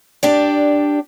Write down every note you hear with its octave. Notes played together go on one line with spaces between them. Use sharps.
D4 G4 D5